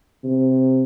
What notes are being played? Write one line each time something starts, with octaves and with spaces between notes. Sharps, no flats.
C3